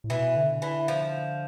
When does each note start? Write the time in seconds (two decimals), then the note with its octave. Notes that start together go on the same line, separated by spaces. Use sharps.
0.04 A2
0.10 B2 E3
0.36 D3
0.62 E3
0.88 F3